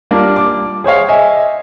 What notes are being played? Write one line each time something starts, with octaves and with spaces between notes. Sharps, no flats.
G3 A#3 D4 F4
D6
G#4 C5 C#5 F5
D#5 E5 G#5